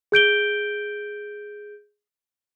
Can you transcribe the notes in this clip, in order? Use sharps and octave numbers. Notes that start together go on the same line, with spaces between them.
G#4 G6 D7 G7